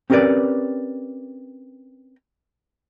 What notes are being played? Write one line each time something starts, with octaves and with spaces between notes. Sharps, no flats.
C4 C#4 G4 A#4 B4 D5